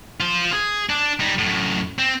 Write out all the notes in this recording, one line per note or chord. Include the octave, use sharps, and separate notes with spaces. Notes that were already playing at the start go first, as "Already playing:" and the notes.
F4 C5
G#4
D4
G3 D#4
F#2 A2
C4